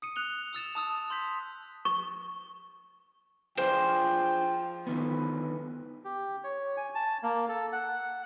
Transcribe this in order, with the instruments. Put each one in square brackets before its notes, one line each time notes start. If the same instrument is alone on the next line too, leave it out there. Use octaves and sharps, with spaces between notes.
[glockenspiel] D#6 C#7 D#7
F#6 F7 G7
D#6 E6 A6 E7
A5 D#6 E6
C6 G6 B6
[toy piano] C#6
[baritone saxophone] F3 [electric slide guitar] D4 F4 G#4 [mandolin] C5 [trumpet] G5
[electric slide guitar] D3 D#3 B3 [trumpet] B4
[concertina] G4
C#5
G#5
A5
A#3
A4
F#5